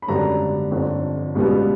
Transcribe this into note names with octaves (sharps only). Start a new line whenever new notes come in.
B5
G#1 F#2 D3 G3 B3 A#5
G1 F2 D3
C#2 B2 G3 B3